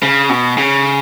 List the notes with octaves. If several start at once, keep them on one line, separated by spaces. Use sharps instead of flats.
C#3
B2
C#3